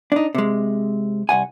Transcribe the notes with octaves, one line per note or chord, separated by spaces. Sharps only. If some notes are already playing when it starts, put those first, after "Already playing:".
D4 D#4
C3 G#3
C2 F#5 G#5